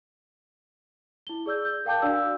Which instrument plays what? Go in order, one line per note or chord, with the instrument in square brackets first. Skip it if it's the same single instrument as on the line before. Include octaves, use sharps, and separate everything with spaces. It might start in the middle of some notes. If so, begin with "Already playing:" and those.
[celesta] E4 G7
G#4 D5 E6 G6
G6
A#4 F5 G5 A5 D6 G6
D4 F#4 D5 F5 E6